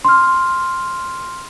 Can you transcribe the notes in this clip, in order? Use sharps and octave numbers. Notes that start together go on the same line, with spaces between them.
C6 F6